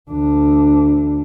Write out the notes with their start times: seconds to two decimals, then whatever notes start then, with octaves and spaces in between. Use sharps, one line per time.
0.11 D2 D4